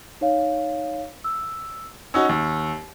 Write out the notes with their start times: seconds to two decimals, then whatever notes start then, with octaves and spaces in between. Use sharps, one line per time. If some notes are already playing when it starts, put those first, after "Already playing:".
0.21 D#4 C#5 F5
1.24 E6
2.14 C#4 D#4 F#4 E6
2.29 D#2